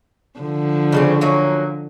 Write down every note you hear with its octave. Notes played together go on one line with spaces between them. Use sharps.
D3 F3
C#3 G3 C4
F#3 A#3 C#4